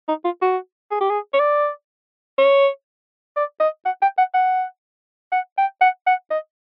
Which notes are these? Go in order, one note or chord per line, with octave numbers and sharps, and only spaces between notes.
D#4
F4
F#4
G#4
G4
G#4
C#5
D5
C#5
D5
D#5
F#5
G5
F#5
F#5
F#5
G5
F#5
F#5
D#5